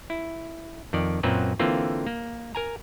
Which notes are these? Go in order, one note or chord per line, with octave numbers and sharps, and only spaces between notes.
E4
F2 D#3 D5
F#2 A#2 F#3 A#3 C4 B4
D3 E3 A#3 C4 F4
A#3
A#4 G#5 A#5